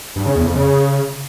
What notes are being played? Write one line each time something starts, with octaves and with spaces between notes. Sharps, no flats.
G2
C#3
E2
F2
C#3